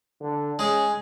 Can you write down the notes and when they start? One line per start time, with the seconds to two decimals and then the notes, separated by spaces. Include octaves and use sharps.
0.21 D3
0.59 G#3 C#4 G#4